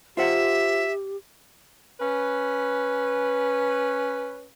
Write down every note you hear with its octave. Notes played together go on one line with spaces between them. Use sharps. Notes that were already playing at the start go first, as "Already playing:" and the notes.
F4 G4 C5 E5 F#5
C#4 B4